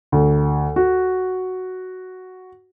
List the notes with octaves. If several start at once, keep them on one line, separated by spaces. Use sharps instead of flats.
D2
F#4